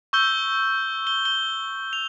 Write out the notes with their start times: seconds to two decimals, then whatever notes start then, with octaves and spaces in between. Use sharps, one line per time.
0.13 C#6 E6 G6 G7
1.07 G7
1.26 G7
1.93 F7